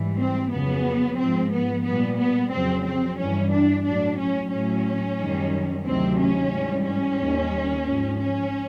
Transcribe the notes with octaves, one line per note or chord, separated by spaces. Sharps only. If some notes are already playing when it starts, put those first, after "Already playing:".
Already playing: G#2 E3 G3
C4
F2 C#3 F#3 B3
G#2 F3 C4
B3
A#2 G3 B3
B3
F2 C#3 F#3 C4
C4
G2 E3 G3 C#4
D4
A2 F#3 D4
C#4
A2 F#3 C#4
F#2 D#3 G3
D2 C3 D#3 F#3 C4
C#4
G#2 E3 G3
C#4
D#2 D#3 G3
G#2 F3
C#4